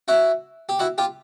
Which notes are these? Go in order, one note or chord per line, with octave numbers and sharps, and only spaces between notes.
E4 F#4
G4
E4 F#4
F4 G4